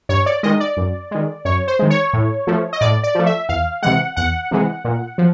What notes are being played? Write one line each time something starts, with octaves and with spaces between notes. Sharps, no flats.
G2 C#5
D5
D#3 G#3 D#5
D5
F#2
D#3 G#3
F#2 C#5
C5
D#3 G#3
C#5
A2
F3 A3
D#5
A2 D5
D5
F3 A3
E5
E2 F5
C3 E3 G#3 F#5
E2 F#5
C3 E3 G#3
A#2
F3